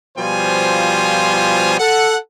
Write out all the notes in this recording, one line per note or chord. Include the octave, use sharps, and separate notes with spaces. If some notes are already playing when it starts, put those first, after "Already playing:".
B2 F3 G3 F4 C5 G#5
A4 F#5